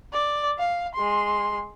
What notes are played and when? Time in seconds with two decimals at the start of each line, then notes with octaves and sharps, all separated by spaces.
0.13 D5
0.59 F5
0.95 G#3 C6